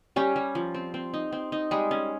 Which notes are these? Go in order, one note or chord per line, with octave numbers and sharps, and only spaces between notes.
G3 C#4 G4
G3
F3
C4
C4
D#4
C4
D#4
G3 G#3 G#4
C#4